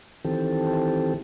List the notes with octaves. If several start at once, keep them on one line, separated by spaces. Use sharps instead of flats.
D#3 E3 C4 G4 A4